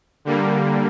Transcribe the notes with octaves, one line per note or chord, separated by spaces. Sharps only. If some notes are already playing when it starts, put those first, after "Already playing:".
D3 G3 A#3